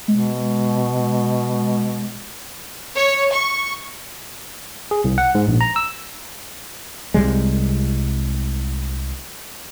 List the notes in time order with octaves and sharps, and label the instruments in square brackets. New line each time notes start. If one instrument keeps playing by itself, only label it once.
[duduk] B2 [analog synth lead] G#3
[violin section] C#5
C#6
[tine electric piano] G#4
C2
F#5
G#2
A#1
A#5
E6
[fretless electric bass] C2 C3 G3 G#3